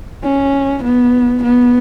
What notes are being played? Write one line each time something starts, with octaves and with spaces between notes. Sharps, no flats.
C#4
B3
B3